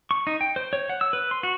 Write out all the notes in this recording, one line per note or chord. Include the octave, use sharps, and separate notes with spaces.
C#6
D#4
G5
C5
C#5
F#5
E6
B4
C6
F#4